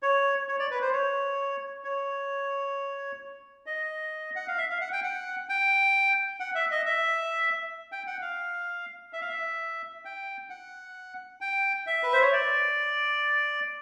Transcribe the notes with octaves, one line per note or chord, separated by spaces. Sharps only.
C#5
C#5
D5
B4
C5
C#5
C#5
D#5
F#5
F5
E5
F5
F#5
G5
F#5
G5
F#5
E5
D#5
E5
G5
F#5
F5
E5
F5
E5
G5
F#5
G5
E5
B4
C5
C#5
D5